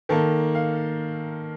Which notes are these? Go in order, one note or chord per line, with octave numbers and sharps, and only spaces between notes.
D#3 A#3 A4
F5